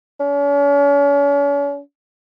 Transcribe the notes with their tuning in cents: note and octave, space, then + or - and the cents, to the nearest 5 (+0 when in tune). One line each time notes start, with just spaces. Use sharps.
C#4 +40